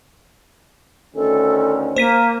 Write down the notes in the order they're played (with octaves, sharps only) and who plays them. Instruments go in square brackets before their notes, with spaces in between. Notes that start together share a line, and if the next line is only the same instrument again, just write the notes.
[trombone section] D2 D#3 C#4 [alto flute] A4
[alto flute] A#3 [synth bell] C5 B6 D#7